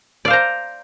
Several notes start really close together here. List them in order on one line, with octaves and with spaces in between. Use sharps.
D5 F5 C5 A#5